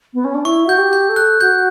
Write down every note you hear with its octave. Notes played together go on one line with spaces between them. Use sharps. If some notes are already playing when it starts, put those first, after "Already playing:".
B3
C#4
D4
E4 C#6
F#4 G6
G4
G6
A4
F#6
F#4 G6